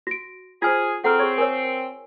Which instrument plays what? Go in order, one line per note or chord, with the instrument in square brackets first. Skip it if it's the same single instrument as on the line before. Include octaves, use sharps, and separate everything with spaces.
[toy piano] F#4 [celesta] A#6 D7
[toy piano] F4 G#5 [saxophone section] G#4 [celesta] C5 F6 G#6
[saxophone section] C4 [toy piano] G#4 F#5 [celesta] A4 A#5 F6
[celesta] G#4 G#6 [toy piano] C#5 C#6
[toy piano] A#4 C#5 [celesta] G#5 E6